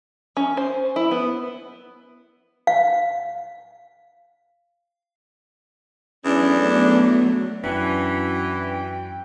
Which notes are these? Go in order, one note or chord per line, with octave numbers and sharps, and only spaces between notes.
C#4
C5
E4
B3
F5
E2 F#3 A3 C#4 D4
B3
F#2 E3 C#4 D4 F#4 G5